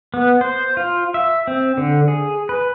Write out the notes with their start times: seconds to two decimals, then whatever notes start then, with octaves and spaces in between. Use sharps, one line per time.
0.14 B3
0.41 C5
0.77 F4
1.14 E5
1.47 C4
1.77 D3
2.08 G#4
2.49 B4